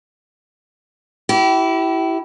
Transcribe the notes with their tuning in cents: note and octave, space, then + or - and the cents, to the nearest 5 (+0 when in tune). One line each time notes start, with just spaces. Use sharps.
E4 +0 G4 -35